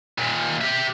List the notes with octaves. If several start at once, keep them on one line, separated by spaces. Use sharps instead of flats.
D#2 A#2
G4 E5